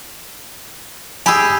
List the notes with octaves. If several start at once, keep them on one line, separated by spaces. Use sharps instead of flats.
G4 G#4 G#5 B5 E6